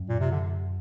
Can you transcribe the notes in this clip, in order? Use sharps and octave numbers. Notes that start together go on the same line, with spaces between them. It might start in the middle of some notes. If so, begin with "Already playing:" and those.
Already playing: F#2
A#2
C3
D3